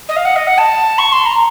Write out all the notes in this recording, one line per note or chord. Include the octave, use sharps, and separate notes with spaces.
D#5
F5
F#5
D#5
F#5
A5
C#6
C6
A#5